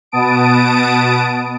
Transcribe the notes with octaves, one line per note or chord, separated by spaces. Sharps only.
B2 B3 A5 D#6 D7